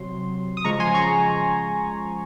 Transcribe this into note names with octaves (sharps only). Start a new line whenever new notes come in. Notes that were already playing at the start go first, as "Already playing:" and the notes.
Already playing: C3 F#3 C6
D#6
C#3 F3 G#3 A#5 C#6
G#5 C6
A#5 C#6